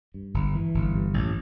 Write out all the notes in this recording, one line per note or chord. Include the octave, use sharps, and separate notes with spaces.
G2
G1
E3
G1
G2
A1